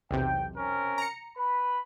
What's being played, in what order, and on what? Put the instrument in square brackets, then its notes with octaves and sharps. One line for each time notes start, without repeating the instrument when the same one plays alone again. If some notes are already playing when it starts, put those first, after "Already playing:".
[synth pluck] B1 E2 C3 [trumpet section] G5
[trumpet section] C4 C#4 A#4
[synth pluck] A#5 C#7
[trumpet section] B4 B5